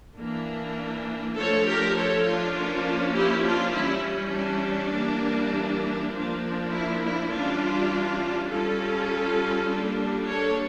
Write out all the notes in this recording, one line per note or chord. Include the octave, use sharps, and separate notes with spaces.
E3 A#3 D4
F3 A3 D4 A4 C#5
G4 A#4
A4 C#5
D4 F4
F3 A#3 C#4
E4 G4
D4 F4
E3 G3 C#4 E4
D4
E3 G3 A#3
F3 A#3 D4
E4
E4
E3 G3 C#4 D4 F4
G3 C#4 F4 A4
G3 A#3 D4
A4 C#5